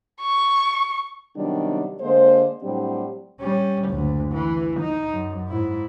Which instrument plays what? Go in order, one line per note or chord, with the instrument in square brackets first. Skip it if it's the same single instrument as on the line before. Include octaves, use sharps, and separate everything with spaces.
[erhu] C#6
[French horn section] C3 D#3 F#3 G3 B3 D4
D3 G#3 A#3 C5
A2 F#3 G3 C4 D4 G4
[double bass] G3 C#4
F#1 D2
E3
D#4
F#2
G#2 E4